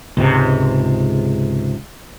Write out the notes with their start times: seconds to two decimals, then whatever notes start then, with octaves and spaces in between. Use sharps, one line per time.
0.17 C#2 G#2 C3